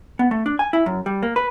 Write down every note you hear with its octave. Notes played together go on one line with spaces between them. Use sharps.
B3
A3
D4
G#5
E4
F#2
G3
A#3
B4